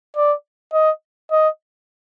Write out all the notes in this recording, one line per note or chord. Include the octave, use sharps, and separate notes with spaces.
D5
D#5
D#5